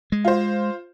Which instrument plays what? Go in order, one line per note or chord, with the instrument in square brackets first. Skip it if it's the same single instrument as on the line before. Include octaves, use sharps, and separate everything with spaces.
[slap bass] G#3
[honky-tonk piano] F4 C5